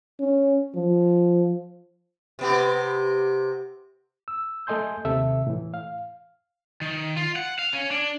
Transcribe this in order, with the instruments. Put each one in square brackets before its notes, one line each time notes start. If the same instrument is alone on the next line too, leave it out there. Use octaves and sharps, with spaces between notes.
[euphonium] C#4
F3
[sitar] C3 B3 G4
[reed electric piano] E6
A3 A4 D#5 G#5 C6 G6
D#2 C3 A4 E5
A2 E3
F5
[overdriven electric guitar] D#3
F4
F#5
F5
C#4
D4